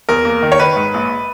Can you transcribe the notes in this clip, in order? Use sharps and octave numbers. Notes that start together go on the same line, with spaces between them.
E2 A#4
A#3
D#3
C#5
D#3 B4
G#2
A#1